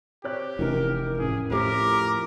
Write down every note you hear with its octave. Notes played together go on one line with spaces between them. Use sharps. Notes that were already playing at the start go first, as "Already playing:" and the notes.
C4 G4 C#5 F#6
F1 E3 C#4 D#4 A#4
A1 G#4
F2 A2 G4 A#4